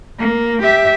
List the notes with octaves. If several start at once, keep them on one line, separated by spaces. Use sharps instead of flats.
A#3
G4 E5